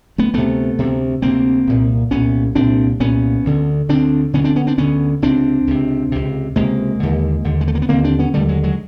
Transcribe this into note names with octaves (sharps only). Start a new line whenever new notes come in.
A3 B3
D2 C3 A3 B3
D2 C3
D2 C3 A#3 C4
C2 A#2
C2 A#2 B3 C#4
C2 A#2 C4 D4
C2 A#2 B3 C#4
D2 D3
D2 D3 C4 D4
D2 D3 B3 C#4
C4 D4
B3 C#4
C4 D4
D2 D3 B3 C#4
C#2 C3 C4 D4
C#2 C3
C#2 C3
C#2 C3 G#3 A#3
D#2 D3
D#2 D3
G#3
A3
A#3
B3
D#2 D3 A#3 C4
C4 D4
B3 C#4
D#2 D3 G3 A3
F#3 G#3
F#3 G#3